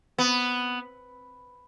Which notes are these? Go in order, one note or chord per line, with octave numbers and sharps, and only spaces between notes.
B3